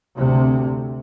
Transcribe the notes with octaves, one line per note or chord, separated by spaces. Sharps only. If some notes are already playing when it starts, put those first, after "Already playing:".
D2 C3